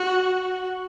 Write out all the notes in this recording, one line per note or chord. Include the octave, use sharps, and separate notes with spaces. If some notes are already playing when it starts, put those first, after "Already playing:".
Already playing: F#4